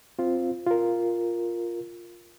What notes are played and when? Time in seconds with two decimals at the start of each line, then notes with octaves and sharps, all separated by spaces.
0.19 C4 F4
0.67 F4 A#4